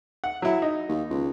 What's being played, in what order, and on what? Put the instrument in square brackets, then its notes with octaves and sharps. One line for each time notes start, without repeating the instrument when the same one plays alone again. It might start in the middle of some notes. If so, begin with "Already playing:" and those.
[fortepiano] F#5
F#3 E4
D#4
[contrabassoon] D#2
C#2